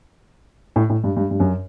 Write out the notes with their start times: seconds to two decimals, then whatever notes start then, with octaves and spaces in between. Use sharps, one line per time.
0.76 A2
0.90 A2
1.04 G2
1.16 G2
1.31 G2
1.40 F#2